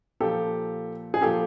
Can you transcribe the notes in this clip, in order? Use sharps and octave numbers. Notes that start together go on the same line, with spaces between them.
A#2 F3 G4 A4
G#4
A#2 F3 G4 A4